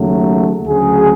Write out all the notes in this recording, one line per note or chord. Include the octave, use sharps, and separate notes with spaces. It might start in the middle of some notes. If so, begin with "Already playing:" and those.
Already playing: D#2 C#3 F#3 A3
D2 C#3 F#3 G#4